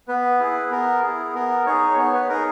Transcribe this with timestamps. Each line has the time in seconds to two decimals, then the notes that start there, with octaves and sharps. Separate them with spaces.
0.08 B3 B4
0.40 E4 G#4
0.71 B3 A#4
1.02 E4 G#4
1.34 B3 A#4
1.66 D#4 G#4 C#5
1.97 B3 C#5
2.14 B4
2.29 D#4 G#4 A#4